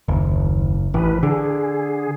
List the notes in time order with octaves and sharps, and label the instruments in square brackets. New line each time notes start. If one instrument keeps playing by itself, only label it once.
[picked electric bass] F#1 [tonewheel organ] D#2
[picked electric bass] A1 [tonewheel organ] E3 B4
[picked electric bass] D3 [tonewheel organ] G#4